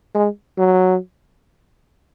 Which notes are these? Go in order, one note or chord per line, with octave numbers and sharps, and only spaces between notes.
G#3
F#3